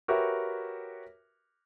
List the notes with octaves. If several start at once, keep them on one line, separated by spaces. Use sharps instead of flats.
F#4 G4 A#4 B4 C#5 E5